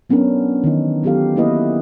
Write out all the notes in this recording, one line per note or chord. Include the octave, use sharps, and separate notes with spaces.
F#3 B3 C#4 D4 A#4
D#3 E3 D#4
F#3 B3 F4 G4 A4 F5
A#3 B3 E4 B4 D#5